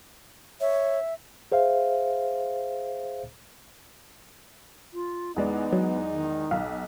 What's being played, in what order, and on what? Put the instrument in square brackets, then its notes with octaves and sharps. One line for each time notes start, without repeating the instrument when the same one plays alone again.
[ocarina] C#5 [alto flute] E5
[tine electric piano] G#4 C5 E5 F5
[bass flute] F4
[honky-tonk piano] E2 G#3 D5 [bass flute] B3 [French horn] D#4
[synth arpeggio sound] F#3
[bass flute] D#3
[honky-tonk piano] B1 [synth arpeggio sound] F5